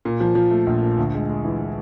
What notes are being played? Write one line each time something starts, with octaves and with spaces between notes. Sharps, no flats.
A#2
F3
F3
A3
A#1
A#2
D2
G#3
G#3
E3